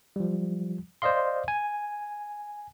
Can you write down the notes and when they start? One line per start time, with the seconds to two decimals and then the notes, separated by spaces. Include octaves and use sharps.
0.16 F3 G3
1.02 C5 D5 D#5 F5 C6
1.48 G#5